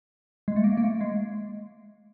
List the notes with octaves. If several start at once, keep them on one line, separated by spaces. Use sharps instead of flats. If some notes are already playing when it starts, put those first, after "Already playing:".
G#3
A3
A#3
A#3
A3
G#3